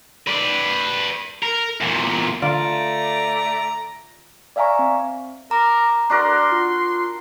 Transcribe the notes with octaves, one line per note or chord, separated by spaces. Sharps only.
B4 D5
A#4
E2 A#2
D3 A3 F4 D5 A#5
D5 E5 F5 G#5 A#5 C#6
C4
A#4 A#5 D6
D4 F#4 A#4 D5 C6
F4